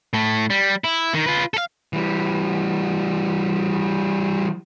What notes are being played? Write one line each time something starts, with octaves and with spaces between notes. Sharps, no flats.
A2 A3
G3
E4
D#3
F4 B4
A4 F5
E3 G3